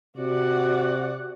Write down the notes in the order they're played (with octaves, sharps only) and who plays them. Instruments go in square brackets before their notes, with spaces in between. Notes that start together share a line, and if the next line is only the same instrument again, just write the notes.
[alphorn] C3 [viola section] F#4 D5 F#5